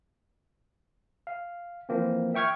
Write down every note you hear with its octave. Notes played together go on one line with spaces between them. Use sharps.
F5
E3 F3 A#3 C4
E5 G5 C#6 F6 G#6